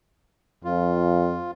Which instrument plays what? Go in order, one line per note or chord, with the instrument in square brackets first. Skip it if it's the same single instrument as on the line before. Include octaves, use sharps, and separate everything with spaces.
[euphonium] F2 [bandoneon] F4